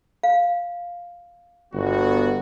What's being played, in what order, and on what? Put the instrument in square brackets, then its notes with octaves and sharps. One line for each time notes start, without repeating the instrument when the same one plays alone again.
[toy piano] F5
[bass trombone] G1 [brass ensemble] B3 F#4